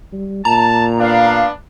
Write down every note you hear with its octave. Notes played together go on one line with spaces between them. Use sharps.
G3
A#2 A5 A#5
B3 D4 F5